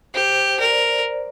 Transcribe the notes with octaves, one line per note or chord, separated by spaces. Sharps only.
G4 C5
A#4 D5